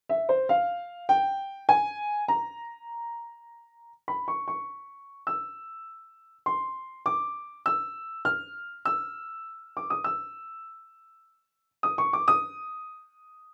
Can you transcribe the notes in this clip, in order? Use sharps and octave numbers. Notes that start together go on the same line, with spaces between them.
E5
C5
F5
G5
G#5
A#5
B5
C#6
C#6
E6
C6
D6
E6
F6
E6
D6
D#6
E6
D#6
C#6
D6
D#6